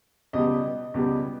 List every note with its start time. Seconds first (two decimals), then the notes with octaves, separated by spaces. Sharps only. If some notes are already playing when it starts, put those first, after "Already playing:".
0.33 C#2 B2 G3 D#5
0.94 C#2 B2 G3